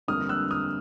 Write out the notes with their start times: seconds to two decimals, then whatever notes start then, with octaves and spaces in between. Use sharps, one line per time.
0.08 G1 F2 D3 G3 A#3 D#6 F6
0.29 E6 F#6
0.51 D#6 F6